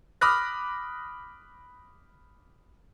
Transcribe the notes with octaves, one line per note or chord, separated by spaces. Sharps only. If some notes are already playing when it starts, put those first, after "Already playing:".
B5 D6 D#6 F6 F#6 A#6